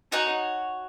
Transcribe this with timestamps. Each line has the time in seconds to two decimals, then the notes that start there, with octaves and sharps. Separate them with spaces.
0.12 D#4 F#4 C#5 G#5